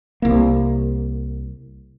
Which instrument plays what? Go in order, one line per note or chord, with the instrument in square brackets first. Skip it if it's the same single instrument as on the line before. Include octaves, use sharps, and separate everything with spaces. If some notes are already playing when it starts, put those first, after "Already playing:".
[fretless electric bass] C2 A#3